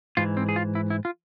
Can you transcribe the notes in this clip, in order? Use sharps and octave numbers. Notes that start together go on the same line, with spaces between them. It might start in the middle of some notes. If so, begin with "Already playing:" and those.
G#2 E3 F4
C4
G#4
F4
E4
E4
F4